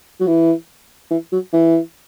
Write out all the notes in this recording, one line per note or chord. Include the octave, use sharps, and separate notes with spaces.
F#3
E3
E3
F#3
E3